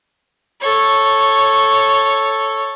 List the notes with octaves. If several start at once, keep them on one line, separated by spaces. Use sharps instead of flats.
A4 C#5